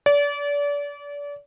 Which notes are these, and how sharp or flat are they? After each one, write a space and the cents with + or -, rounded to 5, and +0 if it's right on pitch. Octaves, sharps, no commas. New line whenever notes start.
D5 -35